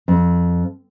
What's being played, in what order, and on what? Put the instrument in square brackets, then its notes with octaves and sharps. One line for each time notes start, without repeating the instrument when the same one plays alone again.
[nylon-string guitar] F2